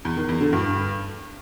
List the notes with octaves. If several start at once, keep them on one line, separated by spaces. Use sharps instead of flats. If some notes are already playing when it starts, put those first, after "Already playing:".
E2
D#3
E2
D3
G2